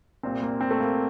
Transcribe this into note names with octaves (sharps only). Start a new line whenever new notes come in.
C2 A#2 C4
A#3
C4
A3
A#3